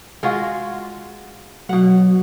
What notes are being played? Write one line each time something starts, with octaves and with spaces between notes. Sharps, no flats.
G#3 F4 F#4
B2 F#3 F#5